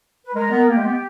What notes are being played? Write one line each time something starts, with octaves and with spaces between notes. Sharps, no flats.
B4
G#3 A#4
B3
A#3 G4
G#3
B3